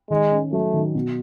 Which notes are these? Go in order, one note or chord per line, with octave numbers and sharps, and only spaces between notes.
D#3 G#3
C#4
F#3 A3
D#3
B2